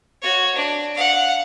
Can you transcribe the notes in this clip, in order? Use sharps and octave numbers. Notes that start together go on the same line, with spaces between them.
F#4 C#5
D4
F5 F#5